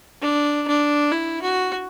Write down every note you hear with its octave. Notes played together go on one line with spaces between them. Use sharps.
D4
D4
E4
F#4